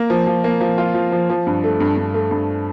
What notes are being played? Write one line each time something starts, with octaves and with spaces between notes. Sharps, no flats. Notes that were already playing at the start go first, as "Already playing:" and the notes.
Already playing: A#3
F3
F3
A#3
F3
F4
F3
F3
F3
G2
A3
G2
G2
A3
G2